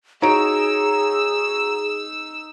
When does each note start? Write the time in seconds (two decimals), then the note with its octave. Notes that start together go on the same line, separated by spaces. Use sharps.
0.22 D#4 F#4 G#4 C#5 A#5 E6 D7